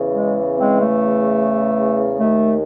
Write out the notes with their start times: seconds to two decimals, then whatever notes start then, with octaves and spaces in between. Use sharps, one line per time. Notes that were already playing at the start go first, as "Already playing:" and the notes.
Already playing: E2 C#3 E3
0.13 G#3
0.59 G#3 C4
0.81 A3
2.19 D#2 D#3 A3